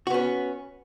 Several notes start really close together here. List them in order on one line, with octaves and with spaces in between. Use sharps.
F#4 B3 C#4